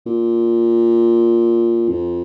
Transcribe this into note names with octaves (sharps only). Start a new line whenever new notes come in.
A#2
F2